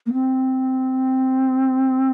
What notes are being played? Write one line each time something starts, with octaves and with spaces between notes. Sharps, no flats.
A#3
C4